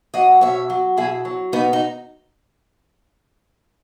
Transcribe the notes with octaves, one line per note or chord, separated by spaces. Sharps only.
F#3 D#5 F#5
B2 C#5 E5
F#3
B2 E4 G#4
F#3
B2 B3 D#4
D#4